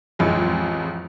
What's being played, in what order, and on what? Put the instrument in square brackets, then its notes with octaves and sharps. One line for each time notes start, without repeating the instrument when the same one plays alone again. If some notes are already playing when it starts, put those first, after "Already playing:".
[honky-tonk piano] A1 F2 G#3